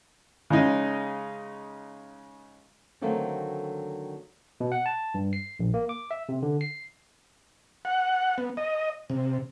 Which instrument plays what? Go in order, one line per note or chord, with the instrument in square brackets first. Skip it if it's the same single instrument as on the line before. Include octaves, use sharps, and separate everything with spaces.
[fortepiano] C#3 G#3 C#4 D#4
[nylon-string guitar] D3 D#3 F#3 A3 A#3 C4
[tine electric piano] B2
F#5
A5
G2
C7
A#1
A#3
D6
E5
C3
D3
C7
[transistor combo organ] F#5
B3
D#5
C3